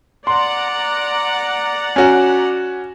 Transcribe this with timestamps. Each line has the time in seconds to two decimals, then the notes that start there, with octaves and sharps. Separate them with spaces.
0.27 D5 F#5 A#5 C6
1.96 C#4 F#4